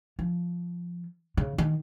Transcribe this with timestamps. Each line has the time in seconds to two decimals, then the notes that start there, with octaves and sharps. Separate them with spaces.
0.19 F3
1.37 C#3
1.58 D#3